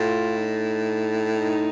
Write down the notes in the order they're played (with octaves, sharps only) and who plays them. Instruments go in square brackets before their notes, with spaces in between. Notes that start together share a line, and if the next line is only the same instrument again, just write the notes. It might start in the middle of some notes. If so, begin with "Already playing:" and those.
Already playing: [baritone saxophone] A2 [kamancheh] F4
[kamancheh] D#4
D#4